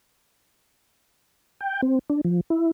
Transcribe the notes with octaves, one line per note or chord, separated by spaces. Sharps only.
G5
C4
D4
F3
E4